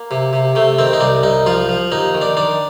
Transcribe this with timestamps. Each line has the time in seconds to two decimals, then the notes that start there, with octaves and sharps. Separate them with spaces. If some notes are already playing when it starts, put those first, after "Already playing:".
Already playing: A#3
0.11 C3
0.33 C3
0.55 C3 A3
0.79 D#3 C4
0.93 D#4
1.01 C2 D4
1.23 C2 D#4
1.46 F3 F4
1.69 F3
1.92 D#2 D#4
2.15 D#3
2.21 D4
2.37 D#3 D4